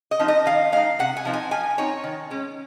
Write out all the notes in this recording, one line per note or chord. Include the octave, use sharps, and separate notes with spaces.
D#5
F3 C4 D#4
D#5
D#3 F5
G#3 D#4 F5
C3 F#5
G#5
F3 C4 D#4
G#5
F3 G#5
C4 D#4 C#5
D#3
G#3 C#4